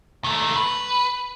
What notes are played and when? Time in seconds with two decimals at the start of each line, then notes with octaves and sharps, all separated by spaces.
0.24 D#3 A3
0.56 B4